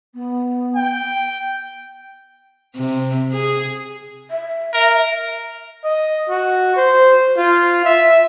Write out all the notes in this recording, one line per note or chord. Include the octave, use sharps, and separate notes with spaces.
B3
G5
C3
G#4
E5
A#4
D#5
F#4
C5
F4
E5